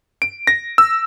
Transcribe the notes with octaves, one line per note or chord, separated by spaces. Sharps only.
D7
A#6
E6